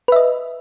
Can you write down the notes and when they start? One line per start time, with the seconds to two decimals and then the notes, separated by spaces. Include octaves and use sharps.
0.08 B4
0.12 E5
0.16 D#5